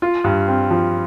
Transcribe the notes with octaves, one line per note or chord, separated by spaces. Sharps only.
F4
G2
C4
F3